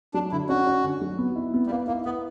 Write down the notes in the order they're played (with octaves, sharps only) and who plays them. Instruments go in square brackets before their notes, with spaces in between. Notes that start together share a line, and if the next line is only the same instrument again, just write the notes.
[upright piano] F#3 [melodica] D4
[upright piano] D3 [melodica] E4
[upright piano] C#4 [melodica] F#4
[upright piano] C#4
D3
F#3
B3
E4
B3
[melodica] G3
[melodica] A#3 [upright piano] B4
[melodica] A#3 [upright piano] E4
[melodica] B3 [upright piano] B4